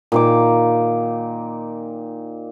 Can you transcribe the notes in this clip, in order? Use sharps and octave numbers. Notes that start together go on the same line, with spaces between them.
A#2 D#3 D6